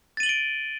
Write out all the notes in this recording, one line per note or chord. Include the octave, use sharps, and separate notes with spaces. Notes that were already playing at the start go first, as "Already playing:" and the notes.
A6 D7 D#7 F#7 G7